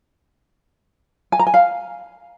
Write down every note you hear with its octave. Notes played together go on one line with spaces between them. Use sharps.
G#5
A#5
G#5
F5